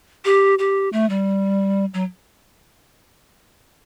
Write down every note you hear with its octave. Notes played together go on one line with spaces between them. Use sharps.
G4
G4
A3
G3
F#3